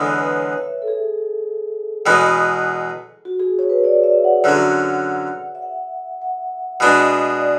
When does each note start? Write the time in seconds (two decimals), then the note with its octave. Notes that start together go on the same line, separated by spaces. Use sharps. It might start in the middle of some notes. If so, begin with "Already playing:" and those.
Already playing: E2 D3 G#3 B3 C#5
0.19 B4
0.28 C#5
0.58 E5
0.82 A4
0.88 G#4
2.06 E2 B2 G#3 B3
3.25 F#4
3.40 G#4
3.59 C#5
3.70 B4
3.84 D5
4.03 E5
4.24 F#5
4.44 F#2 D3 F#3
5.55 E5
5.62 F#5
6.22 F#5
6.80 B2 G#3 B3 D4 E5
7.40 D5